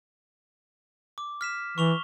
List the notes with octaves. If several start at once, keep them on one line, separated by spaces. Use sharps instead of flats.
D6
F6 B6 E7
E3 C#6 F7 G7